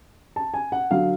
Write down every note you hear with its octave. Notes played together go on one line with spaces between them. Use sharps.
A5
G#5
F#5
D3 F#3 F5